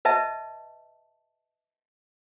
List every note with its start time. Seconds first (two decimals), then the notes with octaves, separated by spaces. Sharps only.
0.05 B4 D#5 E5 A5